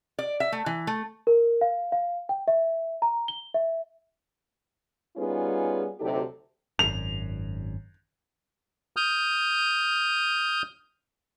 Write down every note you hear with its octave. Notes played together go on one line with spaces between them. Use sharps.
D5
E5
A3
E3
A3
A#4
F5
F5
G5
E5
A#5
G7
E5
G3 B3 C#4 D#4 F4 G#4
D2 C3 F#3 D#4 G4 A4
G#1 F#2 F7
D#6 F6 G6